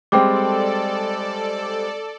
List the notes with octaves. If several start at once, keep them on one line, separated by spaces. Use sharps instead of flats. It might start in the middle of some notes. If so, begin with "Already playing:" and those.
G3 G#3 C4 A4 D5 G5 D6